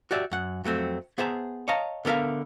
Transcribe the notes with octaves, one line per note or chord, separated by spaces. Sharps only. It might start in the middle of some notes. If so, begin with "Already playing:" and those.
F#4 G4 D5 E5
F#2 F#5
F2 F#3 A3 C4
B3 G#4 C5 E5 A5 A#5
C#5 D#5 F5 A5 A#5
D3 B3 A#4 E5 F5